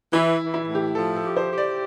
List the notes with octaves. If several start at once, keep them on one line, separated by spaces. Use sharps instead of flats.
E3 E4
E3
E4
A2
G4
F3 A4
A4
G4
C5
G4
D5